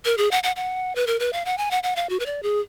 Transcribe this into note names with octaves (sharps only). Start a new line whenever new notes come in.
A#4
G#4
F#5
F#5
F#5
B4
A#4
B4
F5
F#5
G#5
F#5
F#5
F5
F#4
B4
D5
G#4